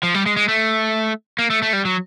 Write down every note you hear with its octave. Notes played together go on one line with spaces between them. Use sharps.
F3
G3
G#3
G#3
A3
A#3
A3
A3
G3
F#3